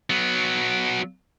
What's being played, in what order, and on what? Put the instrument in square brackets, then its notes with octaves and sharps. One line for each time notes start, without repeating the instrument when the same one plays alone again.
[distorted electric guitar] F#3 B3